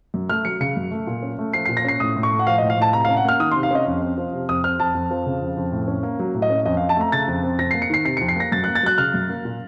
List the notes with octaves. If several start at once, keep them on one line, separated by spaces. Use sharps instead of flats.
F#2
A3 F6
F#3 C#7
C#3 C#7
F#2
A3
A#2
C#4
A3
F3 C7
C7
A#2
A#6
C#4 C7
A2 D#6
A2
C#6
A3
F#5
F3 F5
D#5
A2
F5
A2 A5
C3 A#5
F5
C#4
F#5
A#3 F6
D#3 D#6
C6
C3
F5
C#4 D#5
F2
C4
F3
C3
F2 D#6
C4 F6
F2 A5
F2
F3
C#3
F2
F2
A2
C#4
A#3
F#3
A2
D#5
C#4
F2 D#5
F5
C4
A5
A3 A#5
C#3 A6
F2
C4
F2 A#6
C7
A#3
C#7
D#3 C7
C3 C7
C#7
F2
C7
A#3 A#6
F#2 A6
F#6
A#3
A6
F#3 F#6
C#3 F6
F#2
A#3
A#2